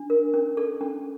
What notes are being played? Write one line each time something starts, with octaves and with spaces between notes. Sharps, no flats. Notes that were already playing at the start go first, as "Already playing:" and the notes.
Already playing: D4
A#4
C#4
A4
C#4